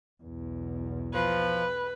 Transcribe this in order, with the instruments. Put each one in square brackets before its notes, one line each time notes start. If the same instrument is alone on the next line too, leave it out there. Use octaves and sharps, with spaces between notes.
[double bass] B1 E2
[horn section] F3 [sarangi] B4